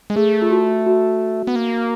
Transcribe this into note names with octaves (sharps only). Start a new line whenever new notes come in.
G#3
A3 G#4
F4
F#4
F#4
B3
A#3